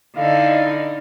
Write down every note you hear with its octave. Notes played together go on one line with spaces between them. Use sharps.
D3 D#4 E4 D#5 F5